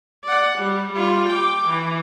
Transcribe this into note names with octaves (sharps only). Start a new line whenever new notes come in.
D5 F#5
G3
G3 F4
G5 D6
E3